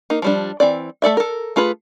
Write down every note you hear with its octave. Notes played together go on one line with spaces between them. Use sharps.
A#3 D#4
F3 G3 D4
E3 C4 D5
A3 A4 D5 E5
A4 A#4
A3 F4 G#4 B4